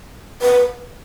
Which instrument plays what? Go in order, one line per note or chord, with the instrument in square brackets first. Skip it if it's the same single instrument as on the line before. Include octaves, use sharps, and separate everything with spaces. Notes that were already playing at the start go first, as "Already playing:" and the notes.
[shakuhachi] B4